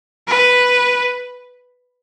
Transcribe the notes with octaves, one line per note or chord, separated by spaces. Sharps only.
B4